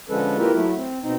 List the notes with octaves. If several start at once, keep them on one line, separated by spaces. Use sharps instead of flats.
D3 F3 G#3 C#4 A4 B4
A#3 E4 F4 G4 A#4 B4
F#3 A3 E4
C4
B2 C4 D#4